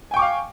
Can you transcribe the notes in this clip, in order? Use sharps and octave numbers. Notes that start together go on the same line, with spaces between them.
F5 G5 G#5 C#6 D6